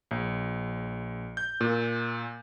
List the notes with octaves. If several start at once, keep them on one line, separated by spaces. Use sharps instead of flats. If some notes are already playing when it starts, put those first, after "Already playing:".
A#1
G6
A#2